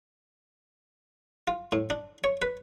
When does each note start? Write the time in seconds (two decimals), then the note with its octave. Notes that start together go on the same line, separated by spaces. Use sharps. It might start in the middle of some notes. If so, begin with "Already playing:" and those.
1.48 F4
1.72 A2
1.90 D4
2.24 C#5
2.42 B4